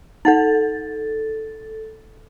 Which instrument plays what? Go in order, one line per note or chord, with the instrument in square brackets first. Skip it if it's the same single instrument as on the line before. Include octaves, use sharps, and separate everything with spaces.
[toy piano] D#4 F#5 [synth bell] A4 A6